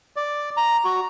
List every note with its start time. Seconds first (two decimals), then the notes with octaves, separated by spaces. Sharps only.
0.16 D5
0.57 A#5
0.85 F#4